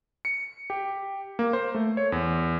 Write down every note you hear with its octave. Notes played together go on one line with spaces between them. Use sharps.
C#7
G4
A#3
C5
A3
C#5
E2